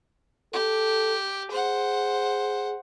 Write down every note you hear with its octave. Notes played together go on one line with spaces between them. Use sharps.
G4 A4
G#4 C5 F#5